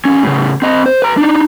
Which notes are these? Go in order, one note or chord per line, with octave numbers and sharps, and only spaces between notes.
E2 C#4
A2 C#3
C4 D#5
C5
B4 A#5
D4 D#4